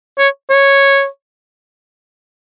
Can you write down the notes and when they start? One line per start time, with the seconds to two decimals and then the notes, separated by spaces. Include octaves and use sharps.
0.18 C#5
0.50 C#5